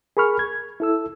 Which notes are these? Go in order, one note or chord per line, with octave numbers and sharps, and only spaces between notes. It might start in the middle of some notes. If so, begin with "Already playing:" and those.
G#4 A#4 B5 C#6 F6
G#6
E4 A4 E6